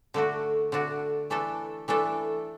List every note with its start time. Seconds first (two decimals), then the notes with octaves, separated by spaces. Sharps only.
0.14 D3 A3 D4 F#4
0.72 D3 A3 D4 F#4
1.30 E3 A3 D4 A4
1.88 E3 A3 D4 A4